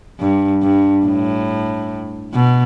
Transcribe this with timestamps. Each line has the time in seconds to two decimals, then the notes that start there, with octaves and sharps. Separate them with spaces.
0.20 G2
0.63 G2
1.06 A2
2.34 B2